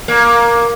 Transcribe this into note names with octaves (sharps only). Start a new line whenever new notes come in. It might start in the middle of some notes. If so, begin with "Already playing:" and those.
A#3